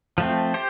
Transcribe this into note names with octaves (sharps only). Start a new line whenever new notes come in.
F3 A3 C4
G4 C5